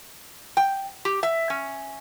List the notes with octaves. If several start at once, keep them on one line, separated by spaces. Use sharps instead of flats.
G5
G4
E5
C#4